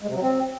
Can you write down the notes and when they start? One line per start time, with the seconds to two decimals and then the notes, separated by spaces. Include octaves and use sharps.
0.02 G#3
0.09 C3
0.15 F#3
0.22 C4